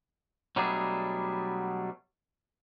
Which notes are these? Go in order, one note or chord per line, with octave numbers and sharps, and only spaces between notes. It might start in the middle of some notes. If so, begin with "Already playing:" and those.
B2 F#3 G3 A3 D4 G#4